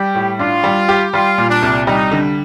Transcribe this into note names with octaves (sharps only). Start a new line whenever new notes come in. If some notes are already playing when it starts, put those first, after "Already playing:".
Already playing: G3 G4
A2
D4 F4
G3
G4
G3 F4
A#2
D4
C2
G3 D#4
D3